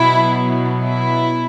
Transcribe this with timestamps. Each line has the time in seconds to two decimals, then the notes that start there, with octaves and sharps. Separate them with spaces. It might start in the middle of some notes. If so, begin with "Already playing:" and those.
Already playing: B2 F#3 B3 E4
0.83 E4